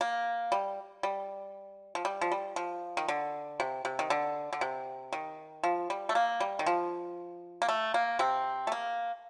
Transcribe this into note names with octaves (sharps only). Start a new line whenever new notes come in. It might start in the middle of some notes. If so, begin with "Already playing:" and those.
A#3
G3
G3
F3
G3
F3
G3
F3
D#3
D3
C3
C3
D#3
D3
D3
C3
D#3
F3
G3
A3
A#3
G3
D#3
F3
A#3
A3
A#3
C3 C4
A3
A#3